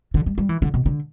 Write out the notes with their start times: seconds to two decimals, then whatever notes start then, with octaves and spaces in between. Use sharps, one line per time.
0.14 D3
0.26 G3
0.38 G3
0.49 E3
0.62 D3
0.74 B2
0.86 D3